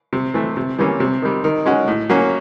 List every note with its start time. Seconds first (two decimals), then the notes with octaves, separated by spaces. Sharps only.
0.13 C3
0.34 E3 A3
0.57 C3
0.79 E3 G3 A#3 C#4
1.00 C3
1.22 D#3 G3
1.44 D#3
1.66 G#3 C#4 F#4
1.88 A2
2.10 F#3 A#3 C#4